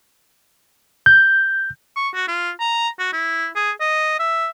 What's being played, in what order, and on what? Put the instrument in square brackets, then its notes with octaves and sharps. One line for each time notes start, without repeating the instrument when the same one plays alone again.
[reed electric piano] G6
[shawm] C#6
F#4
F4
A#5
F#4
E4
G#4
D#5
E5